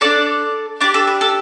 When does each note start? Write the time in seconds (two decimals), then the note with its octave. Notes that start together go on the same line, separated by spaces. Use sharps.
0.01 D4 A4 D5
0.81 D4 G4 D5
0.94 A4
1.07 B4
1.21 A4